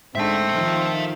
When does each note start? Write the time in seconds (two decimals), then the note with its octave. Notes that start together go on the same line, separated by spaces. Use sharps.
0.15 G#2 D3 C4 E5 A5
0.52 D#3 F3 F4